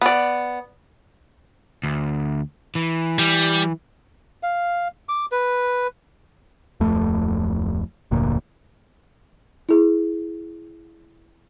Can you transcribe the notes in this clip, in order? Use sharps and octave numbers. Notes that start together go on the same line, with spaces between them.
B3 D5
D2
E3
G3
F5
D6
B4
D1 F2 A3
F1 D2 A#2
E4 G#4